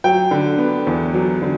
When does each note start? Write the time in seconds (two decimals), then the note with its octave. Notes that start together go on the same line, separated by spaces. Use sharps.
0.04 F#3 G5
0.31 D3
0.58 B3
0.87 E2
1.14 F#3
1.42 D3